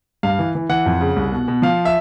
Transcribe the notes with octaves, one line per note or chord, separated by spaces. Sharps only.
G2 F5
E3
E3
E3 F#5
F2
C#3
C2
B2
B2
F3 F5
E5